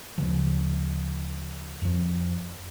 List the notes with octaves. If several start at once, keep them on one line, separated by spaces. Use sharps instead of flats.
D2 C#3 F3
F2 F3